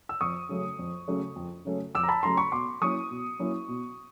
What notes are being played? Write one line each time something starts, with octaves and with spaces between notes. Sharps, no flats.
E6
F2 C#6 D#6
C#3 F#3 A3 C#4
F2
C#3 F#3 A3 C#4
F2
C#3 F#3 A3 C#4
F2 D6 E6
A#5
A5 B5
C#3 F#3 A3 C#4 A#5 C6
B5 C#6
B2 C6 D6
F#3 A#3 C#4 E4 C#6 D#6
B2
F#3 A#3 C#4 E4
B2